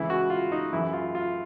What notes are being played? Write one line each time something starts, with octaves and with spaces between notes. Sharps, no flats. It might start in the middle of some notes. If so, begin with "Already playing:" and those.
Already playing: C#2 C#3 E3 E4
F#4
F4
D#4
F#2 C#3 E3 E4
F4
F4